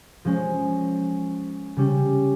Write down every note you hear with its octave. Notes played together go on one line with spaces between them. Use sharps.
F3 G#3 C#4
C#3 G3 C#4